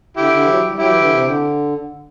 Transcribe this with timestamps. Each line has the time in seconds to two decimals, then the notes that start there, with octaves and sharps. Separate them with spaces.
0.17 D3 E4 G4
0.32 D3
0.44 E3
0.47 F#3
0.69 G3
0.79 F#3 E4 G4
0.89 E3
0.99 D3
1.10 C3
1.25 D3